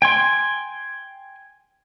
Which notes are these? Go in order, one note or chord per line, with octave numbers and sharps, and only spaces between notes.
G5 G#5 C6